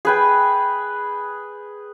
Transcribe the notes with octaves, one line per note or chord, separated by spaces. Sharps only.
G#4 B4 G5